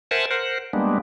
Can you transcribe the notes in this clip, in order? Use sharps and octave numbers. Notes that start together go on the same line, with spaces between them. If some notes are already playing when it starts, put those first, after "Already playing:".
A#4 C5 E5 F#5 G#5 A5
A#4 C5 F#5
G3 G#3 A#3 B3 D4